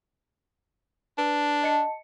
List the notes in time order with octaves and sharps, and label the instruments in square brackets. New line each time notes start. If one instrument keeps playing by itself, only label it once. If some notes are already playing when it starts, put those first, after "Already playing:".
[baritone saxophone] D4 [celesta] B4
[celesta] D#5 A5 C#7